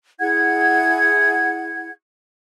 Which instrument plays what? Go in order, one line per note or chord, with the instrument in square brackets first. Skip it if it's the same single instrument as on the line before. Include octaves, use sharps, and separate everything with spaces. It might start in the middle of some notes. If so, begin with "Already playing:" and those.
[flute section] E4 G#4 F#5 G#6